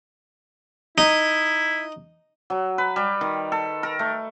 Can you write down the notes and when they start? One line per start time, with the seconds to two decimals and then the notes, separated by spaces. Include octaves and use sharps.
0.98 D#4 E4
2.50 F#3
2.78 B4
2.96 G3
3.21 D#3
3.52 A4
3.83 A#4
3.99 A3